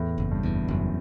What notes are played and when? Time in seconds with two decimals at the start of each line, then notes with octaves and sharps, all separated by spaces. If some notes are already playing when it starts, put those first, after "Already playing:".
Already playing: E2 A2
0.18 F#1
0.31 G2
0.43 E2
0.68 F#1 F#2